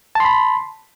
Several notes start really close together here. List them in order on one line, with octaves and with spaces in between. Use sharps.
A5 C6 B5